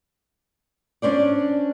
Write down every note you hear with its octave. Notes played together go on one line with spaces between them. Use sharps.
C#4 D4 C5 D5